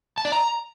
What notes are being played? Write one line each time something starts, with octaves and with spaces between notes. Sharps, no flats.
A5
D5
A#5